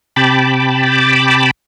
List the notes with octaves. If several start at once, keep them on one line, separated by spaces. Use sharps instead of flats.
C3 G5 A5 B5 D6